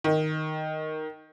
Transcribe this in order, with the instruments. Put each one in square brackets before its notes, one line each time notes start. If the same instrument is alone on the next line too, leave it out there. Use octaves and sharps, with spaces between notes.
[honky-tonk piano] D#3